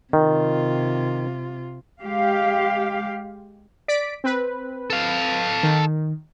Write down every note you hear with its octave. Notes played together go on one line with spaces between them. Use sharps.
C3 D#3 F4
G#3 G4 F5
D5 B6 D7
C4 B4
A4 F5
D#3